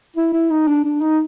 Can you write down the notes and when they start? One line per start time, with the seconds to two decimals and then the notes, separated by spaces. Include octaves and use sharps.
0.16 E4
0.33 E4
0.51 D#4
0.67 D4
0.84 D4
1.01 D#4